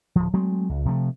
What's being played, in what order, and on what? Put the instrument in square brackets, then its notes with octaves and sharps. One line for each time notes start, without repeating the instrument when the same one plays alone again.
[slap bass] D1 F3
F#3 G#3 A3 C4
C#2
C3 F3 A3